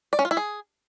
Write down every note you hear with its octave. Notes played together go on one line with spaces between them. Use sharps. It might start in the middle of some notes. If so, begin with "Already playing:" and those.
D5
C#4
F4
E4
G#4